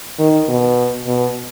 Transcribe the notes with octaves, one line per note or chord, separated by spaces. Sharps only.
D#3
B2
B2